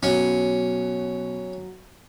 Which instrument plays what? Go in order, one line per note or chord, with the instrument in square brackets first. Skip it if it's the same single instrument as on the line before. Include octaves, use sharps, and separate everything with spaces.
[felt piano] B2 [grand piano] F#3 [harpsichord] C#4